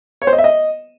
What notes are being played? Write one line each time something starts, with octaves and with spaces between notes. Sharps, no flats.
C#5
C5
D#5
E5
D#5